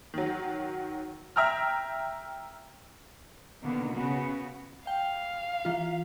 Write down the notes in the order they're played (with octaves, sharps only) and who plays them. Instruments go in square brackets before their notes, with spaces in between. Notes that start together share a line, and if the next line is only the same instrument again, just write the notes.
[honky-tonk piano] D#3 F#3
E5 G5 A#5 E6 F6
[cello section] B2 D3 D#3 A#3 B3
C#3 B3 F#4
[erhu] F5 [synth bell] G5
[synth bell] E3 F4